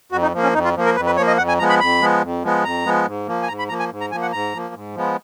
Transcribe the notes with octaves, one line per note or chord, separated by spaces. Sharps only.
F2 F#4
D#4
F3 A#3
C#4
F2 D#4
F4
F3 A#3
A#4
F2 B4
B4
F3 A#3 C#5
D#5
F2 F#5
G#5
F3 G#3 B3 A#5
B5
F2 B5
F3 G#3 B3
F2
F3 G#3 B3
F2 A#5
F3 G#3 B3
G#2
F3 A#3
G#5
G#2 A#5
B5
F3 A#3 A#5
G#5
G#2
A#5
F3 A#3 G#5
F#5
G#2 A#5
F3 A#3
G#2
F3 G#3 B3